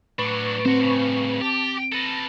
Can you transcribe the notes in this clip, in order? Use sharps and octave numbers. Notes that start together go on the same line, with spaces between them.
A2 F#3 D4 B4 C#6
C4 F#4 C5
G2 C#3
G4 A5 D6
A4 B4 A#6